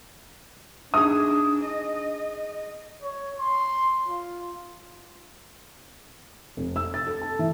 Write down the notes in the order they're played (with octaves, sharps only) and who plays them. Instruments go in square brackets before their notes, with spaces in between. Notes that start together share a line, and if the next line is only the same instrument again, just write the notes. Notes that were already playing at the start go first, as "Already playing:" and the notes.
[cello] D4 [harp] D#4 G#4 [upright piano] D#6
[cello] D#5
[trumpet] C#5
C6
F4
[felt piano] F1
E6
A6
A4
A5
E3